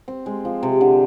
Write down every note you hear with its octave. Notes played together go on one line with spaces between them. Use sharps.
C4
G#3
F3
C3
D3